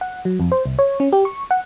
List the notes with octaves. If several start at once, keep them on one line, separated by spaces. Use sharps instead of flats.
F#5
F#3
F2
C5
C2
C#5
C#4
G4
C#6
F#5